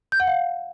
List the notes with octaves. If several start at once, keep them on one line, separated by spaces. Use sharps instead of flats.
G6
F#5
F5